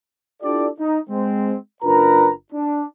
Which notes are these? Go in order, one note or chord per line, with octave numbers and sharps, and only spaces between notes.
D4 E4 F4 G4 A4 D5
D#4
G#3 C4
F#1 D4 F4 A#4 B4 A#5
D4